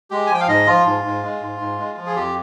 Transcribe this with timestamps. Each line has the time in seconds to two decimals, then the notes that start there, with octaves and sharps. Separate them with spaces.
0.11 G#3 G4
0.26 G#5
0.29 F3 G5
0.40 F5
0.48 G#2 D#5
0.66 F3 F4
0.86 G#2
1.05 G#2
1.23 G#3
1.41 G#2
1.59 G#2
1.78 G#3
1.97 F3
2.07 G#4
2.15 F2 G4